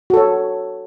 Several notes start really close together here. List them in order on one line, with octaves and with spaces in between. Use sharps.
F#4 A4 C#5